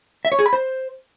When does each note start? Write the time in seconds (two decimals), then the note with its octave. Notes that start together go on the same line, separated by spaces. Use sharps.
0.25 E5
0.32 C#5
0.39 G#4
0.46 B5
0.53 C5